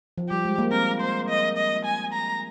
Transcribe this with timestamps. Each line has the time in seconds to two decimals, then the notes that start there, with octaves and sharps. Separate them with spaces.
0.18 F3
0.29 G3 G4
0.45 G#3
0.58 A#3
0.71 C4 A#4
1.00 C5
1.29 D#5
1.57 D#5
1.85 G#5
2.13 A#5